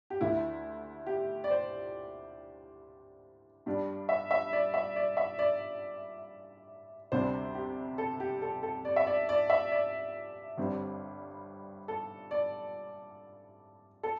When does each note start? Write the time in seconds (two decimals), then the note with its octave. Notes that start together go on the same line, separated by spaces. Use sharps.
0.10 G4
0.20 D2 D3 A3 E4
1.06 G4
1.44 D5
1.51 C5
3.66 G2 G3 D4
4.09 E5
4.31 E5
4.53 D5
4.74 E5
4.96 D5
5.17 E5
5.39 D5
7.12 D2 C3 G3 D4 C5
7.55 G4
7.98 A4
8.20 G4
8.42 A4
8.63 A4
8.85 D5
8.96 E5
9.07 D5
9.29 D5
9.50 E5
9.72 D5
10.57 G1 G2 G3 C4
11.88 A4
12.31 D5
14.03 A4